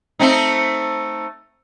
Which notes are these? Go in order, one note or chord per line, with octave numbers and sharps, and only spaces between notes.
A3 C4 D#4